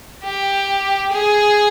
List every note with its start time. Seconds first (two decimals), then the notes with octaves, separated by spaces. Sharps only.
0.23 G4
1.12 G#4